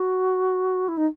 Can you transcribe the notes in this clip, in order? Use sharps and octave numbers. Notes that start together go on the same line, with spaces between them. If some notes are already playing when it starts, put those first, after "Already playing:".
Already playing: F#4
E4
D#4